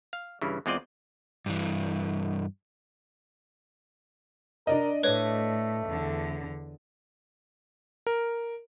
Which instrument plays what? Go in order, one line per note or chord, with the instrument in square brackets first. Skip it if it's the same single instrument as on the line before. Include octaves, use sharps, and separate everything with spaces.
[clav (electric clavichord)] F5
G2 C#3 E3
E2 G#3 C4 F4 D5 D#5
[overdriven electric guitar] G2 E3
[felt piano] D4 D5 D#5 [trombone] A#4
[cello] A2 [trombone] A3 [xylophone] B4 C#5
[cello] E2 D3
[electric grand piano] A#4